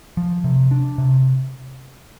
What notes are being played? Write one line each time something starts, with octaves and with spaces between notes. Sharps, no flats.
F3
C3
D4
C3